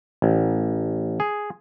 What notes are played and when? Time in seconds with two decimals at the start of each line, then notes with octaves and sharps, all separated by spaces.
0.22 A1
1.20 G#4